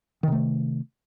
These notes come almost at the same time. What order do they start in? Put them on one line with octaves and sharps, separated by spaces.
D#3 C3 A3